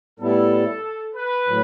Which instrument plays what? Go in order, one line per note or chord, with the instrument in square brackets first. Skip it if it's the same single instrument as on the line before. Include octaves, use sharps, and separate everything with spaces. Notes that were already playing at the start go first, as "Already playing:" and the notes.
[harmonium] A2 G3 B3 E4 [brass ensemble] A4
[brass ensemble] B4
[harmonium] A2 F#3